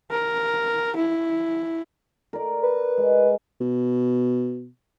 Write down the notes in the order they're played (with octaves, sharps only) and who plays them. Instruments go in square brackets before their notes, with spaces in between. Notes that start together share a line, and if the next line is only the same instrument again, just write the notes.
[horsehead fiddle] A#4
E4
[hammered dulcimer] A#4 D5
[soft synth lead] B4
[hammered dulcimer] G#3
[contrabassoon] B2